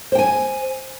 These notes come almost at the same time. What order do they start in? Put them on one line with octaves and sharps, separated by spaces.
C5 G5 G#5